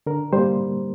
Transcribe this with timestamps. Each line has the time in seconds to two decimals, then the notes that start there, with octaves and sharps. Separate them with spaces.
0.06 D3 A#4
0.33 G3 A#3 C5